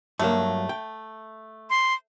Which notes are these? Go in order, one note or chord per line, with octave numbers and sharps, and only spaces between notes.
G2 F#3 A3 A#3
G5
C6